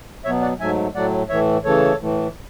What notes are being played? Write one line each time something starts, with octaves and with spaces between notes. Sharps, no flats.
B2 F#3 B3 C#5 E5
D5 F#5
G#2 F#3 A3 E5 G#5
A2 F#3 A3 D5 F#5
A2 E3 A3 C#5 E5
C#3 E3 A3 A4 C#5
A2 E3 A3